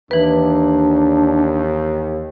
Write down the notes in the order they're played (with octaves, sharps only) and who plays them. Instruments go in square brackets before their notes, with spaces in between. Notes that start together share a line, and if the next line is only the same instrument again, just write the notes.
[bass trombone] D#2 [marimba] E3 B4 [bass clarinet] D4